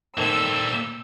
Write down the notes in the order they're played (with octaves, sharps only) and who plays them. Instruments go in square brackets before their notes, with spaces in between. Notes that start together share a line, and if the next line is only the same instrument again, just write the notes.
[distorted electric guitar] A#2 G3 [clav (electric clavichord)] D#3 A3 C4 [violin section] E6